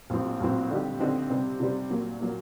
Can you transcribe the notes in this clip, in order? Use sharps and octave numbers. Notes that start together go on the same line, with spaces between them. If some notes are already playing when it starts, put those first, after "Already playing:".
A#1 A2 F#3 C4
A#1 A2 F#3 C4
D3 G3 C4 D#4 G4
D3 G3 C4 D#4 G4
C3 G3 C4
C3 G3 C4
A#2 F#3 A#3
A#2 F#3 A#3